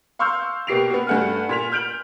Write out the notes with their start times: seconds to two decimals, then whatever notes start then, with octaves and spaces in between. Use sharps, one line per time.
0.19 F5 C6 C#6 E6 F6 G6
0.67 B2 A#3 G4 C7 F7
0.90 B3 F#4
1.07 G2 A3 F#5 G#5 F6
1.49 A#2 B6 F7
1.72 F6 G6 D7 F7 F#7